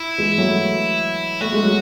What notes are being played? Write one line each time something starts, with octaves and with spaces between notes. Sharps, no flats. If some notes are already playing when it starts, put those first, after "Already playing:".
Already playing: E4
E3 G#3
F#3 A3
A3 F#4
G#3
F#3